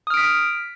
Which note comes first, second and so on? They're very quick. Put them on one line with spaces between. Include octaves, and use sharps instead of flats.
D#6 F6 D7 B6